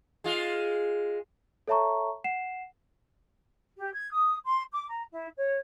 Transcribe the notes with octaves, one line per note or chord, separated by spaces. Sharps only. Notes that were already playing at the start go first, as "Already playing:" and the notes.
G#3 F4
A4 C#5 E5 A5 A#5 C#6
F#5 C7 E7
G4
G#6
D#6
C6
D6
A#5
E4
C#5